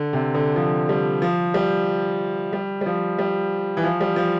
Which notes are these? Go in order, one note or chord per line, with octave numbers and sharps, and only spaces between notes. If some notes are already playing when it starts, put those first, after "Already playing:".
Already playing: D3
C3
D3
F3
G3
F3
G3
G3
G3
F3
G3
E3
F3
G3
F3